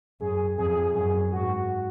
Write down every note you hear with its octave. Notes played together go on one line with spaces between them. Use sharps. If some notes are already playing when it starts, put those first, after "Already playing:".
F#2 G#4
F2 G#4
G#4
G#4
F#2 G#4
G#2 F#4